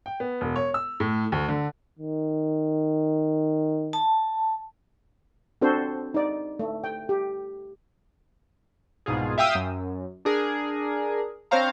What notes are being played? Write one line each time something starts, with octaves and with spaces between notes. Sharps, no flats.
G5
B3
E1
C#5
E6
A2
D2
D3
D#3
A5
C4 D4 F#4 A4 C5
D#4 D5
A3
G5
G4
C2 G#2 B2 F4 G#4
E5 F5 G5 D#6 E6
F#2
D4 G#4 A#4
C4 D4 C5 C#5 F5 A#5